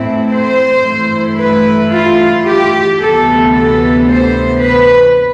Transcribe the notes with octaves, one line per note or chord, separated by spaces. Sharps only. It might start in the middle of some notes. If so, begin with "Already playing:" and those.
Already playing: A2 E3 A3 C4 E4
C5
G2 E3 A3 E4
B4
F4
G4
D2 C3 E3 B3 A4
A4
C5
B4